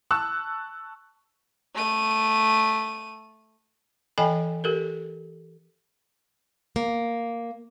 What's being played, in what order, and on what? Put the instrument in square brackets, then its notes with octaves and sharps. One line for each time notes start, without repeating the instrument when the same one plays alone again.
[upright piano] A5 C#6 E6 F#6
[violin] A3 D#7
[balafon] E3 A4 D#5 G5 G#5 B5
G4 A4 A#4
[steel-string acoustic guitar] A#3